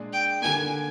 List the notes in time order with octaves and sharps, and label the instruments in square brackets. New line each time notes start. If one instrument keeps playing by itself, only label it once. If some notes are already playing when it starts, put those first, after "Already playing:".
Already playing: [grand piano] A#2 G#3 D4 G#4
[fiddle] G5
[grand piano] D3 G3 A#3 [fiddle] G#5